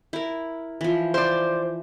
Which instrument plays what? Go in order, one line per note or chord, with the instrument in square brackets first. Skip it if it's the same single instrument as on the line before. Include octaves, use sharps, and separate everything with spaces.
[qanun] E4 A#4
E3 F3
[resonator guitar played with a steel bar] C5 D5